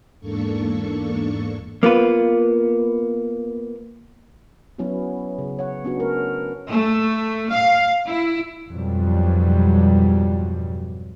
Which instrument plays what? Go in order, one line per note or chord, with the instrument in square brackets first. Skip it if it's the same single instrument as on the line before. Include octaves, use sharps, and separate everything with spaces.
[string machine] E2 G#2 A#3 D4 A4 C#6
[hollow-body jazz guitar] A#3 B3 F4 B4
[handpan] F#3 B3 C#4 E4 F#4
C#3
C#5 F#5
B3 C#4 D4 F#4
A3 A#4
[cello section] A3
F5
E4
[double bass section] F2 G#2 B2 F#3 G3